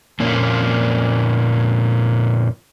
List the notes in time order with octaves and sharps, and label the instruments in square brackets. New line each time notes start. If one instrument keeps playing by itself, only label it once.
[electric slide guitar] F2 A#2 A#3 C#4